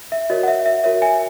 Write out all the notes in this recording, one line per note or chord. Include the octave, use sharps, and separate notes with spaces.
E5
F#4 A#4 C#5 D#5
F#5
E5
E5
F#4 A#4 C#5 E5
E5 G#5